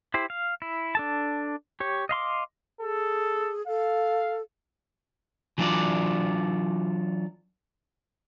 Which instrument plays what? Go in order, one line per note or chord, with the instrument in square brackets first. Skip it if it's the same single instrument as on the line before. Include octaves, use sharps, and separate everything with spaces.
[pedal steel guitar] E4 G4 C5
F5
E4
D4 A4 A5
G4 C#5
D#5 F5 C6 D6
[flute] G#4 [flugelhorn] A4
[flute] A4 [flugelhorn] F5
[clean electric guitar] E3 F#3 D4 F4 A4 D5